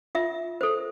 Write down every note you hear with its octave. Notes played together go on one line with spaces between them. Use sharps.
F4 E5
A4 C5